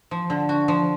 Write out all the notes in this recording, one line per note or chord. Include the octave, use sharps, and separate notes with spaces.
F3
D3
F#4
F3